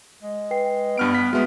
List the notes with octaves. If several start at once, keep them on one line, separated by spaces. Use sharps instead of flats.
G#3
B4 G5 C7
G2 B3 F6 D7
F#5 B6
G#3 A3 B3 F#4